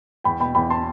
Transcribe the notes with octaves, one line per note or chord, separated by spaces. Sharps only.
E2 G5 B5
B2 G5 B5
E2 G5 B5
A5 C6